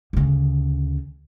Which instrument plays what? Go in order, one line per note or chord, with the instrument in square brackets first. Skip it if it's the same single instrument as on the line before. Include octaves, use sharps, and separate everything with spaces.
[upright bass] D2 C#3